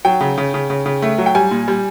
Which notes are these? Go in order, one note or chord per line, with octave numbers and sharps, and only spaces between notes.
F#3 G5
C#3
C#3
C#3
C#3
C#3
A3
F#3
G5
G3 G#5
A#2
G3